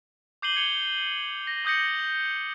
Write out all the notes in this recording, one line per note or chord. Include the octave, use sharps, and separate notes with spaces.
D6 G6 C7 D#7 F#7 G7
G#6 C#7 F7 G7
A#6
D6 D#6 G6 A#6 C#7